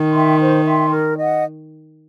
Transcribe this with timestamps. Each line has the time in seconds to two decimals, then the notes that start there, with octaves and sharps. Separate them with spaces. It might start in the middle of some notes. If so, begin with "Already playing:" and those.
Already playing: D#3
0.11 E5 G5 C6
0.38 C5
0.64 E5 G5 C6
0.90 A#4
1.18 D#5 F#5